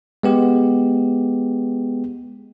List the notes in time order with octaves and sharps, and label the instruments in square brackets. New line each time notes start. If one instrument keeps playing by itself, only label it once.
[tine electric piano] G#3 B3 G4